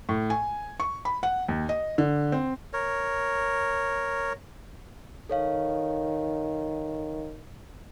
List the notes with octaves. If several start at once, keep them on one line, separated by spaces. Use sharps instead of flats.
A2
G#5
C#6
B5
F#5
D#2
D#5
D3
C4
A#4 C#5
D#3 A4 C#5 F5